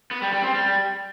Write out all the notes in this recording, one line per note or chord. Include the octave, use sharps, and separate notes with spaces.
B3
G3
G3
C4
G3